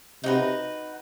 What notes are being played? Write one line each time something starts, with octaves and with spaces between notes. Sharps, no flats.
C3 D#4 F#4 B4